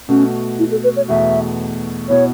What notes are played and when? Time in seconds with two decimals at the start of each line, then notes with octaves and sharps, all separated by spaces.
0.09 B2 A3 C#4 F#4
0.59 E4
0.71 A4
0.84 B4
0.96 C#5
1.08 E2 B2 A3 F#4 E5
2.09 B2 B3 E4 C#5